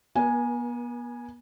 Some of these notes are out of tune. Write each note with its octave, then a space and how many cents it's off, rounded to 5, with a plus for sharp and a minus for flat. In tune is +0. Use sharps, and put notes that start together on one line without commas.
B3 -35 A#4 +40 G#5 +0